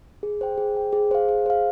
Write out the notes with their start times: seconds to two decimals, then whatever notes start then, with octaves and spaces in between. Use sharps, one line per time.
0.23 G#4
0.41 C5 G5
0.58 G#4
0.75 C5 G5
0.93 G#4
1.11 C5 F5
1.29 G#4
1.46 C5 F5